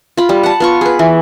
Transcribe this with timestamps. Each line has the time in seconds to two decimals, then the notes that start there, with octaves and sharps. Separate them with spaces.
0.17 F4 B5
0.29 G3
0.43 F#5 A5
0.60 B3 F4 C#6
0.81 G#4 B4
0.99 E3